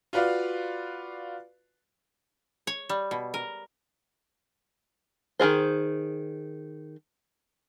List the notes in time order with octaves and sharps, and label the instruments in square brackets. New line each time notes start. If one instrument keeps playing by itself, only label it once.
[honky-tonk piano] F4 F#4 B4 D5 F5
[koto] C#5
G3
B2
A#4
[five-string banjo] D#3 F#3 G#4 C5